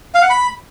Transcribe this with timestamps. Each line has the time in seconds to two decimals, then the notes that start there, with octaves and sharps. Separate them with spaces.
0.15 F5
0.22 F#5
0.30 B5